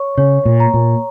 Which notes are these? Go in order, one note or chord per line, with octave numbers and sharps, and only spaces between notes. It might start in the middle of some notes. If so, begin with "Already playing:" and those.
Already playing: C#5 C#6
C#3 C#5
A#2
A#5
A#2